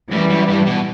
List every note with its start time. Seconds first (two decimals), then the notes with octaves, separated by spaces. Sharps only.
0.11 F#2 E3 G3
0.30 F#2
0.48 G2
0.67 B2